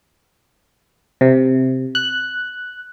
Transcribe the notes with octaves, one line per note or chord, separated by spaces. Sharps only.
C3
F#6